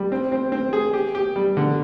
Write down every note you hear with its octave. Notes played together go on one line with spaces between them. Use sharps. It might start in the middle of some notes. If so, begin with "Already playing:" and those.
Already playing: G3
C4
C4
C4
G#4
G4
G4
G3
D3